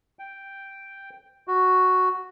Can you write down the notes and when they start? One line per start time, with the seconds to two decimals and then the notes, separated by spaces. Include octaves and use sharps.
0.19 G5
1.48 F#4